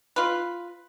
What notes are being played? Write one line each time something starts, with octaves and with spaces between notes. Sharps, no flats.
F4 B4